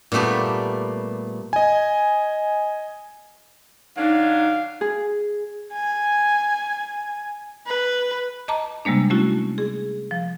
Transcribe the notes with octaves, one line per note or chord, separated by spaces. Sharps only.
A#2 G3 A3 B3 G4
D#5 G#5
D#3 F#3 D4 D#4 F5
G#4
G#5
B4
D#5 A5 A#5 D6
C3 G3 G#3 A#3 D4
A3 C#4 E4 F#4
G#4
F3